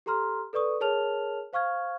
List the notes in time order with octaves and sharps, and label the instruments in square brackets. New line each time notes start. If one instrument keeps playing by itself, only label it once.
[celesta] G4 A4 A#5 C6 F6
A4 B4 D5 C#6 D#6
G#4 A#4 C#5 A5 F6 F7
C5 F5 C#6 F6 G#6